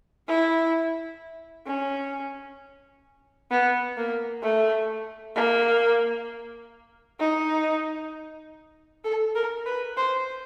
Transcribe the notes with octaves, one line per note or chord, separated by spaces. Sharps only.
E4
C#4
B3
A#3
A3
A#3
D#4
A4
A#4
B4
C5